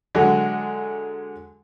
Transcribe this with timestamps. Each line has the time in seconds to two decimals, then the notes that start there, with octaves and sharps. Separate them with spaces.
0.15 D3 F#3 G#3